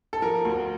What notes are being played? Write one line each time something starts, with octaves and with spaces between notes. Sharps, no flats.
A4
F3 A#4
D2